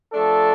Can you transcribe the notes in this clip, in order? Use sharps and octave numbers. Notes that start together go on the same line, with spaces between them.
F3 A3 D4 A4